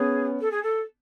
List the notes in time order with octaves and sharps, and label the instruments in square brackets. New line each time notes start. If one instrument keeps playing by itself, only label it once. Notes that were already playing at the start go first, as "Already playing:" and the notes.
Already playing: [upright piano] B3 C#4 [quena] G#4
[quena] A4
G#4
A4